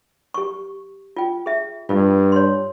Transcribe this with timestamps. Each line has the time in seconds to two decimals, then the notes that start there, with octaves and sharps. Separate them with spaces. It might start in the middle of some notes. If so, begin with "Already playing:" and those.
0.34 G4 C#6
1.17 F4 G5
1.46 G#4 E5
1.89 G2 F4
2.32 C#5 C6